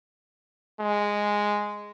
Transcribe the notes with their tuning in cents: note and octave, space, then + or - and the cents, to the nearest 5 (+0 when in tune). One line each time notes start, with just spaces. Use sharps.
G#3 -5